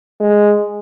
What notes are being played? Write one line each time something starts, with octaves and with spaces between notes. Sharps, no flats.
G#3